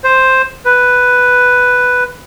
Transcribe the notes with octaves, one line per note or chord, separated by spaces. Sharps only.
C5
B4